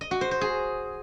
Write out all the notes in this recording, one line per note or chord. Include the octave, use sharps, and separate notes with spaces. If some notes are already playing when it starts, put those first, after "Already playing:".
D#5
F#4
C5
C5
G#4